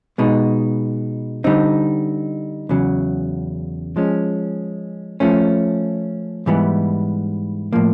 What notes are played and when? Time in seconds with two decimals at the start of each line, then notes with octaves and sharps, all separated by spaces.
0.18 B2 G#3 B3 D#4
1.44 D3 G3 C4 D#4
2.69 E2 C#3 F#3
3.96 F3 G#3 C#4
5.20 F3 A3 C#4
6.46 G#2 E3 G3 B3
7.73 A2 F3 A#3